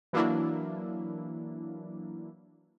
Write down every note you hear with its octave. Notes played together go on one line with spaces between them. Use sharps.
E3 F#3 A#3 D4 E4